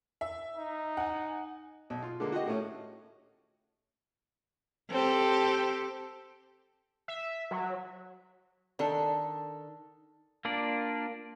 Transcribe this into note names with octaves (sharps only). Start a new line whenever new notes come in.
E5
D#4
F#5 G#5
B1
F4
D3 G#3 A#3
F#4 G4 D#5
A2 A3 C#4
C4 G4 A4
E5
F#3
D#3 D4 A4
A#3 D4 F4 D5